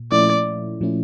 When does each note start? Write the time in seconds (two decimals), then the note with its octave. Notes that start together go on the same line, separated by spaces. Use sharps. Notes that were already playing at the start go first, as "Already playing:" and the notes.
Already playing: A#2
0.12 A#2 F3 A3 C#4 E4 D5
0.81 A#2 F3 A3 C#4 E4